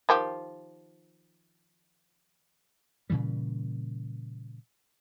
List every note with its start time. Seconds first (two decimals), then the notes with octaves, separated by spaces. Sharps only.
0.09 D#3 F3 G4
3.10 A#2 C#3 E3 G3